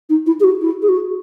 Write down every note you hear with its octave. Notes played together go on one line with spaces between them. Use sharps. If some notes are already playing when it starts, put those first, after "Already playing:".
D#4
E4
G#4
F#4
E4
G#4
F#4